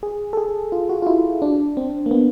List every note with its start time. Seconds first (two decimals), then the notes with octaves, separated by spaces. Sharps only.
0.03 G#4
0.33 A4
0.37 G#4
0.72 F4
0.89 F#4
1.02 F4
1.07 E4
1.42 D4
1.77 C4
2.06 A#3
2.11 B3